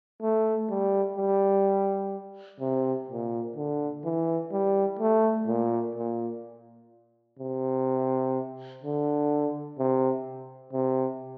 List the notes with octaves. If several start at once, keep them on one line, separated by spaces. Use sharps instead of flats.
A3
G3
G3
C3
A#2
D3
E3
G3
A3
A#2
A#2
C3
D3
C3
C3